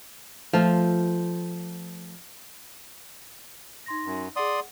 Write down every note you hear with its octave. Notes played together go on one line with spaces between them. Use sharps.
F3 A3 F4
D#4 C6 A#6
F#2
G#4 D5 F#5 C6 D#6